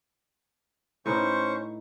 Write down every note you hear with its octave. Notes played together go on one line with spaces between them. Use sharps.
A2 C#4 D#4 B4 C5 C#6